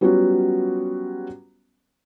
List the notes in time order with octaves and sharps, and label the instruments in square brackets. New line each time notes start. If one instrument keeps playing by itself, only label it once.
[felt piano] F#3 G3 B3 C#4 F4 F#4